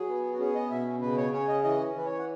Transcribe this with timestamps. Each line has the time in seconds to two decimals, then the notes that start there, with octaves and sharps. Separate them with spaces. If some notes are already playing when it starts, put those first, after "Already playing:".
Already playing: F#3 G#4
0.09 B3
0.33 F#4
0.39 C#4 G#4
0.55 D#5
0.70 B2 E5
1.02 C#3 B4
1.17 C#5
1.32 C#4 C#5
1.48 D#5
1.64 E3 D#5
1.95 E3 B4
2.06 C#5
2.19 F#5